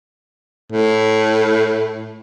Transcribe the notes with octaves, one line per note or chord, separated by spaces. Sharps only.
A2